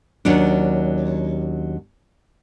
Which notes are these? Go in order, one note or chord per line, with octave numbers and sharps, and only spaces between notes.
D#2 F#3 C#4 D4